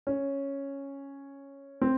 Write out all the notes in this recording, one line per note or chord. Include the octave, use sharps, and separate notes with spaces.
C#4
C4